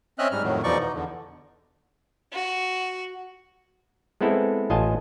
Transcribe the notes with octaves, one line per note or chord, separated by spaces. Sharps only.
C4 C#4 D#5 E5 F6 F#6
G#2 G3 F6
F2 A2 D#3 F#3
E2 B2 F3 D#4 D5 C#6
D#4
E2 D3
F#4
G#3 B3 C4 E4 A4
A1 F4 D#5 G#5 A5